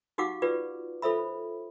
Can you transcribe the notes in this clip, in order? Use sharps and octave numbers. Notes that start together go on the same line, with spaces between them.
D#4 F#4 G4 F5 F#5 D6
F4 G4 B4 D5
F4 A4 C5 E5 B5